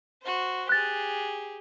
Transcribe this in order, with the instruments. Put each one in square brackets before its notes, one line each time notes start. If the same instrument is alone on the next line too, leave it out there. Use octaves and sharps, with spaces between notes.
[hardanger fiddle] F#4 C5
[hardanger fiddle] G4 G#4 [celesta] F#6 A6